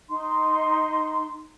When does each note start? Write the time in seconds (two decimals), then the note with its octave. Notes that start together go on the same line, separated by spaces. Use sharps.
0.08 D#4 C6